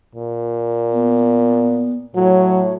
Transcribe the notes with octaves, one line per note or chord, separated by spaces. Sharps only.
A#2
B3
A2 F#3 C#5